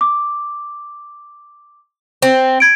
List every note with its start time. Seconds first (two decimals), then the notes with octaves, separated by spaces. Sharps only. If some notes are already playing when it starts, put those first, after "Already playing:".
0.01 D6
2.22 C4
2.60 G#6 D7